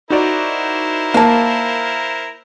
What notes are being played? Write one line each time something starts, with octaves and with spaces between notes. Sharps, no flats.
D#4 E4 F#4 A#4 C5 D5
A#3 F5 A5